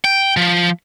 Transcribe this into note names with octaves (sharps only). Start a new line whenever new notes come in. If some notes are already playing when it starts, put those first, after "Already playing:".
G5
F3